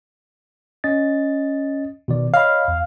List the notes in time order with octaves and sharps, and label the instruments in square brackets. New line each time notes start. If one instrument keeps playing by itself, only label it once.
[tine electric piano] C#4 D#5 A6
B2 D#3 D5
[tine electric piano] C#5 D#5 B5 [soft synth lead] F5
[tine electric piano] E2